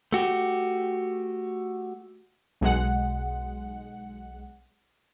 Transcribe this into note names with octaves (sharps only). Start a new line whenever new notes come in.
A3 F#4 G4
B1 G#3 F#5